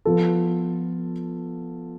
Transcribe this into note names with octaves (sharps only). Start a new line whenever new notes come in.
F3 B3 F4 A4